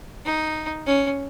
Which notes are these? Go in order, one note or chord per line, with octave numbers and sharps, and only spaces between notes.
D#4
C#4